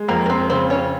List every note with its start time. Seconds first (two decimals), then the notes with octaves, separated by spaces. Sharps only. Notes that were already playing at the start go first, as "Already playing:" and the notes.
Already playing: G#3
0.08 F2 A#3 A#4
0.26 A#4
0.30 C4 C5
0.50 C#3 C4 C5
0.70 C#4 C#5